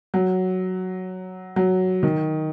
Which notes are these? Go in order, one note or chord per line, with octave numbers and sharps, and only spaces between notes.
F#3
F#3
D#3